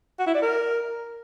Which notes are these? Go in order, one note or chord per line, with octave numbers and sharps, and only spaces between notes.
F#4
E4
D5
A#4